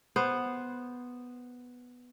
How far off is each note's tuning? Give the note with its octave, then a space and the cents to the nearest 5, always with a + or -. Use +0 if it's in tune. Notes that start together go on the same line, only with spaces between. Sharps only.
B3 +0 C5 +0